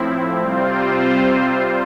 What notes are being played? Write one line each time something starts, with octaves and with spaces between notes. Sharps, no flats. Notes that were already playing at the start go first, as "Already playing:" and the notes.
Already playing: A2 F3 C4 E4
C3 G3 C4 F4 C5